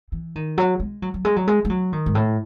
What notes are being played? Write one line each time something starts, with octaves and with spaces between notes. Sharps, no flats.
E3
D#3
F#3
G#3
F#3
F#3
G#3
F#3
G#3
G#3
F#3
D#3
G#2
A2